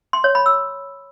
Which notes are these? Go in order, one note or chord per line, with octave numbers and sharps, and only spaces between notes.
C6
C#5
B5
E6